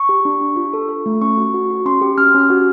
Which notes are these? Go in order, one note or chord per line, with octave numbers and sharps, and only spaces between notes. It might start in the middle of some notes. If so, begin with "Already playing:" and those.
Already playing: C#6
G4
D4
D4
F4
A4
A4
A3
C#4 C#6
F#4
F#4
F#4
C#4 C6
G4
C#4 F6
C#4
F#4